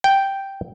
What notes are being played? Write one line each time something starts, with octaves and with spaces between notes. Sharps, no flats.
G5